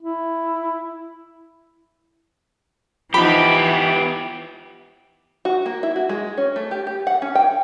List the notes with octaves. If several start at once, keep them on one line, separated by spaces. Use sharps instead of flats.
E4
E3 F3 B3 D#4 G4 B5
F#4
A#3
E4
F#4
G#3
C#4
A3
G4
G4
F#5
C#4
G5